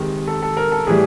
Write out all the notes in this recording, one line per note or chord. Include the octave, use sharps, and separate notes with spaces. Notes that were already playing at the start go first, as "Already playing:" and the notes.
Already playing: C3 D#3 G#3
A4
A4
A#4
A4
A2 E3 G3 G#4